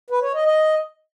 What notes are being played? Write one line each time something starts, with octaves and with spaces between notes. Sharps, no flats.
B4
C#5
D#5
D#5